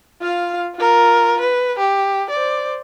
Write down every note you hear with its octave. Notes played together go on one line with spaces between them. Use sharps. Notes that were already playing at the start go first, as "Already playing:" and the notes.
F4 F5
F4 A#4
B4
G4
C5 D5